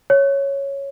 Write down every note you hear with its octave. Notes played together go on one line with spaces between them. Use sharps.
C#5